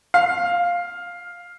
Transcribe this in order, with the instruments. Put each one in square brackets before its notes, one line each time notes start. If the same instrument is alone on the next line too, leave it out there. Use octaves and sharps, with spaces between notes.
[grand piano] F5